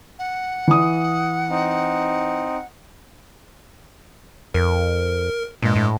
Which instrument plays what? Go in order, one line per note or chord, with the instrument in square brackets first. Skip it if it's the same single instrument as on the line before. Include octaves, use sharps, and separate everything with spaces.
[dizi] F#5
[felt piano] E3 D#6
[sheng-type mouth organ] C4 D#4
[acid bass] F2 [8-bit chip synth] A#4
[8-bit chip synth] G2 G#3 [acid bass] A#2
[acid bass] A2